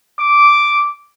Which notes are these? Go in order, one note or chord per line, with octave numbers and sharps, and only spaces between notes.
D6